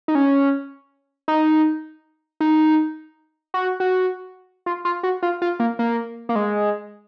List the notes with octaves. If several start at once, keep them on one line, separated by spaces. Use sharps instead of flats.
D#4
C#4
D#4
D#4
F#4
F#4
F4
F4
F#4
F4
F4
A#3
A#3
A#3
G#3